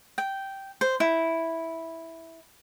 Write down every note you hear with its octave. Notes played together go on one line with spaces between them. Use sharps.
G5
C5
E4